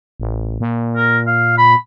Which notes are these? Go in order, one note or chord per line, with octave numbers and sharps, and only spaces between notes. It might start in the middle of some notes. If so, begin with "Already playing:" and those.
A1
A#2
A#4
F5
B5